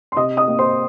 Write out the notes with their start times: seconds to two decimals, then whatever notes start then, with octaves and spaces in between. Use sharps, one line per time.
0.12 C6
0.16 C3 D#5 D#6
0.37 D#5 D#6
0.48 A#3
0.59 C5 C6